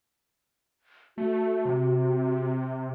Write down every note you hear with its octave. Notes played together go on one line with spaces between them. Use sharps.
A3 F#4
C3